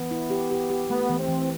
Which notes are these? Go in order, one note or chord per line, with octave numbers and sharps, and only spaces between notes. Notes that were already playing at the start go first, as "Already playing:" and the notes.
Already playing: E3 B3
E4
G4
G4
G4
A3 B3
E3
C4
E3